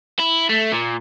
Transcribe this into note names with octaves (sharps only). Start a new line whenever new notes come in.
E4
A3
A#2